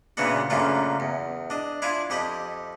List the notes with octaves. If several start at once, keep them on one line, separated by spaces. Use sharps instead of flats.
A#2 C#3 E3 B3 D4 F#4
F#2 C#3 A3 A#3 D4 F4
E2
D4 D#5
D4 E4 F4 F5 G#5
F2 G4 D#5 B5